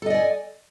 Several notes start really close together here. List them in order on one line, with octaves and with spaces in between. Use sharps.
A4 D#5 D5 G#5